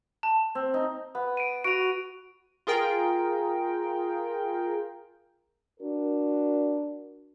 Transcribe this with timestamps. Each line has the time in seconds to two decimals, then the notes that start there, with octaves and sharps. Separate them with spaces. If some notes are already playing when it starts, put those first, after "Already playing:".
0.23 A5
0.55 C4
0.74 D#4
1.15 B3
1.37 D7 D#7
1.64 F#4 D7 F7
2.67 F4 G#4 A#4 G5
5.80 D4 F#4 A#4